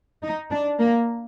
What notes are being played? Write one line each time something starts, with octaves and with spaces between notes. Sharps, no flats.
D#4
D4
A#3